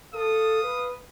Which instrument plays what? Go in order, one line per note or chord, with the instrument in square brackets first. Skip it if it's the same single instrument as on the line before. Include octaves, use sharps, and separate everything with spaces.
[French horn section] A4 [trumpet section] F5 D#6
[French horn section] B4